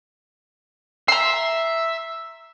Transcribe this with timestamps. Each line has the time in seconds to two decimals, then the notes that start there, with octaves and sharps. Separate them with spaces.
1.08 E5 A#5 C6